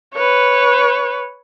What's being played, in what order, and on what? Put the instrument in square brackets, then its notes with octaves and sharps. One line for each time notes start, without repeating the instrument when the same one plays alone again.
[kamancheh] B4 C#5